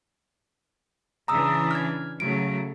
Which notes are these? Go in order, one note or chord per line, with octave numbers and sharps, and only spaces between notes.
C#3 E3 D4 A#5 D#6 E6
F6 G#6
C#3 F#3 A3 D7